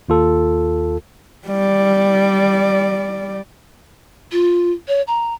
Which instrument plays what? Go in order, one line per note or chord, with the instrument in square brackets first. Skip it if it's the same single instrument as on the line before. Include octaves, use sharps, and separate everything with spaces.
[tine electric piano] D#2 F4 A4
[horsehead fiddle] G3 D5
[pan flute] F4
C#5
A#5